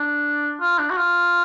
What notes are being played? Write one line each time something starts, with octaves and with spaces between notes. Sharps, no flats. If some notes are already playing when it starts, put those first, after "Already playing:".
Already playing: D4
F4
D4
F#4
F4